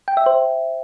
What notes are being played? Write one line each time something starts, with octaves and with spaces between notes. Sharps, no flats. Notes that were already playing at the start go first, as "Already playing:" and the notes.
G5
E5
C5